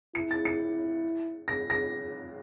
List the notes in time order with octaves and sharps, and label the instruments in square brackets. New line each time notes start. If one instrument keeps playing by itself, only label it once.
[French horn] E4 [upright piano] C#7
[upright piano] A6
C#7
A#6
A#6